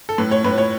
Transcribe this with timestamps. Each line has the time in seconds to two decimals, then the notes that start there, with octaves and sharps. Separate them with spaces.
0.09 A4
0.18 A2 B4
0.31 C#5
0.45 A2 B4
0.58 C#5